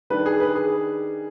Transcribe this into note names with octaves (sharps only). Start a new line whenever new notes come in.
D#3 G3 D4 B4
G#4
B4
G#4